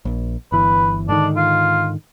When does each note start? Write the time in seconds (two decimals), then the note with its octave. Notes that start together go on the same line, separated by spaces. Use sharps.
0.05 A#1
0.52 G1 E3 B4
1.08 G#2 D3 D#3 D4
1.36 F4